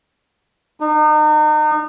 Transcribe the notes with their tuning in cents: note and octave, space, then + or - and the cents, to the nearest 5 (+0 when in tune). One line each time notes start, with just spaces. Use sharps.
D#4 -35